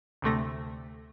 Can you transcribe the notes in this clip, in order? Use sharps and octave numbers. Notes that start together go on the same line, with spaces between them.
D2 C3 A3 A#6